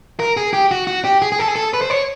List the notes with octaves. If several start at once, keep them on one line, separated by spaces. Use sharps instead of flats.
A#4
G#4
G4
F#4
F#4
G4
G#4
G#4
A4
G#4
A4
B4
C5
C#5